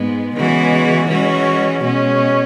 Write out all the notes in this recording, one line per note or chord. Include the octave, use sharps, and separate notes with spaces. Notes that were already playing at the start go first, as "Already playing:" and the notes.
Already playing: G#2 G#3 B3
C#3 E3 G#3 B3 F#4
E3 G#3 C#4 F#4
B2 G#3 C#4